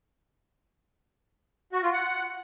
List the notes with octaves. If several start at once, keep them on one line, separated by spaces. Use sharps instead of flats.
F#4
F4
F#5